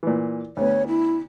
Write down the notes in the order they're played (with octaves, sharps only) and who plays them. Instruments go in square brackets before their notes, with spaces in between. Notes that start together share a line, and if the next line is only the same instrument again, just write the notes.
[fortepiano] A#2 E3
[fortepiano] D2 B3 [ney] C#5
[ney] E4